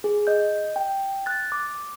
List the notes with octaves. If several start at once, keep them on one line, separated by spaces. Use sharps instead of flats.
G#4
D#5 G6
G5
F#6 A6
D6